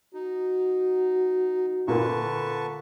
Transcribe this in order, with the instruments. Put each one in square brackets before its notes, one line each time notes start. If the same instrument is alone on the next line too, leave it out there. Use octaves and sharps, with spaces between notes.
[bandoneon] D#4 [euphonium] F#4
[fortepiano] A#2 A#3 [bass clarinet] D3 [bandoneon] B4 A5 C#6